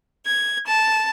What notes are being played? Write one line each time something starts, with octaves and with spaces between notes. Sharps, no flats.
G#6
A5